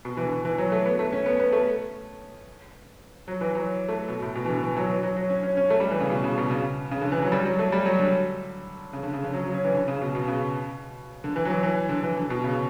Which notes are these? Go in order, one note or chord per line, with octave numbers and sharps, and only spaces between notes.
B2
E3
D3
E3
F#3
A3
B3
A3
C#4
B3
B3
A3
F#3
E3
F#3
A3
B2
A2
B2
E3
D3
E3
F#3
E3
F#3
F#3
C#4
C#4
C#4
A3
G3
E3
C#3
B2
C#3
B2
C#3
C#3
D3
E3
F#3
G3
F#3
A3
G3
F#3
D3
C#3
D3
C#3
D3
F#3
F#3
C#4
E3
D3
C#3
B2
B2
C#3
D3
E3
F#3
E3
E3
D3
E3
D3
B2
C#3